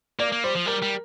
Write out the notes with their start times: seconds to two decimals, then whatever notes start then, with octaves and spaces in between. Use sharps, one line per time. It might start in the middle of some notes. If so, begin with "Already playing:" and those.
0.19 A#3 D5
0.32 A#3
0.44 G3 C5
0.55 F3
0.66 G3 A#4
0.82 G3